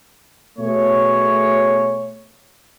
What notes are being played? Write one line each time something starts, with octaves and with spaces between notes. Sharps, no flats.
B2 A3 G#4 C#5